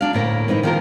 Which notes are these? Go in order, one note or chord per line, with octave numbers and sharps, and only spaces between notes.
F#3 D4 F5
D2 A2 A#3
E3 C4 D#4 E4
D#3 F3 A#3 E4 F4 A#4